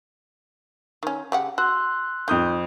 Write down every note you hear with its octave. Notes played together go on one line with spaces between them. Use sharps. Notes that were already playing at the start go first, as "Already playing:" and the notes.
D#3 C#4
C#3 G4 F#5
F#4 C6 E6 F#6
F2 D#3 D#6 G6